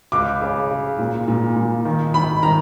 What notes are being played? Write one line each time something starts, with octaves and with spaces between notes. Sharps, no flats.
C#2 D6
C#3
C#3
A#2
A#2
A#2
D#3
D#3 B5
D#3 A#5